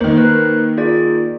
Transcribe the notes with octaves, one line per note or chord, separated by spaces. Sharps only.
D#3 A#3 C5
A#4 B4 F#6
F4 G#4 D5